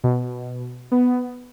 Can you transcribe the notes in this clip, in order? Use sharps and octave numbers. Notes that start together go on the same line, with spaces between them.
B2
B3